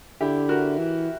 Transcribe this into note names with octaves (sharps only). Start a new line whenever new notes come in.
D3 E4 G4
F#4 A#4
E3